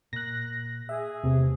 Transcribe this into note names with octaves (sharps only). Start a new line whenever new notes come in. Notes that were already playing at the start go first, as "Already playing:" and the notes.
A#2 F#6 A#6
G#4 E5
E2 C3 A3 B3